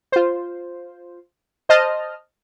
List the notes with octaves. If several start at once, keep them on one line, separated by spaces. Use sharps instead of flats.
F4 C5
C5 D#5 A5 F6